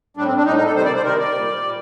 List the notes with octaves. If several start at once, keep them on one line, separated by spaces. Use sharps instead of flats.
A2 G3 D4
C4
D4
A2 G3 D#4
D#4
A4
C3 D#3 G3 C5
D5
C5
C3 D#3 G3 A#4
D5
A#2 G3
A#2 G3